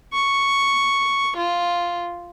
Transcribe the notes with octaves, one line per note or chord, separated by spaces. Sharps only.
C#6
F4